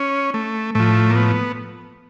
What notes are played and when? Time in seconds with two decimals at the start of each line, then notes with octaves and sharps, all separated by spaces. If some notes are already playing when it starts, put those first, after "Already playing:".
Already playing: C#4
0.34 A3
0.75 A2 F3 A3
1.10 A#3
1.16 B3